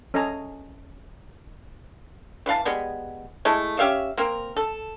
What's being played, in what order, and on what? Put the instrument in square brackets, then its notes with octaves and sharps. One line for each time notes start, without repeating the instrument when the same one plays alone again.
[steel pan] C#4 A4 D#5 G#5 A#5
[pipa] E3 B4 F5 A5
G3 G#3 B3
G#3 A3 E4 A4
C#4 G4 E5 F5
A#3 C4 A#4
A4